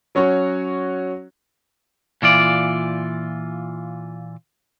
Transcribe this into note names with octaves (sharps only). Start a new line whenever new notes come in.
F#3 C#4 F#4 C#5
A#2 E3 F4 D5